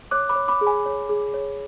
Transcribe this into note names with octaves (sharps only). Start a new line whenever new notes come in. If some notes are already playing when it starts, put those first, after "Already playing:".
C#5 D6 F#6
B5 D6
C#5
B5 D6
G#4
G#5 B5
C#5
G#4
C#5